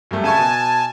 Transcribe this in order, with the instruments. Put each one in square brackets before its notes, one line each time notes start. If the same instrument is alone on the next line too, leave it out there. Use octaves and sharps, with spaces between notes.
[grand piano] F#2 G3 A3
[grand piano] C#3 E5 C#6 [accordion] G#5 A5
[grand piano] B2